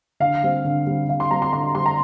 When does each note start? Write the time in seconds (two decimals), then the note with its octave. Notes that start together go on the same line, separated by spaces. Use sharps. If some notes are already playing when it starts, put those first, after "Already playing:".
0.20 D3 F5
0.43 G3 C4
0.65 D3
0.87 G3 C4
1.08 D3 F5
1.20 C6
1.31 G3 C4 A#5
1.42 C6
1.53 D3 C6
1.75 G3 C4 C6
1.86 A#5